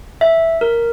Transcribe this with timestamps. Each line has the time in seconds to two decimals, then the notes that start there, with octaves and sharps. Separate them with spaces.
0.21 E5
0.61 A#4